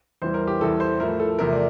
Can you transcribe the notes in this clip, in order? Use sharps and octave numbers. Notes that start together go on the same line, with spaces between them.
E2 E3 G3 C5
A#4
G4
E2 E3 G3 A4
C5
A2 F3 A3 A#4
A4
E2 C3 F3 A3 A#4
D5